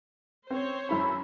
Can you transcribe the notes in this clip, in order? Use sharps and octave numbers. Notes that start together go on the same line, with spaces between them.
C4 C5 C#5
F#2 E4 B5